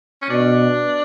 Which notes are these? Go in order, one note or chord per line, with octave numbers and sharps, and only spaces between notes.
C#4
B2 D4